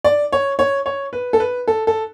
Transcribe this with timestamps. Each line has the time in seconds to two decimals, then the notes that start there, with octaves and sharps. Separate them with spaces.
0.04 D5
0.32 C#5
0.59 C#5
0.86 C#5
1.13 B4
1.33 A4
1.40 B4
1.68 A4
1.87 A4